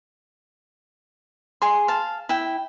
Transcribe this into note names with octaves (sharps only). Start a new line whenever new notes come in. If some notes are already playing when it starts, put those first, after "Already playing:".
G#4 C6
F5 A5
E4 G5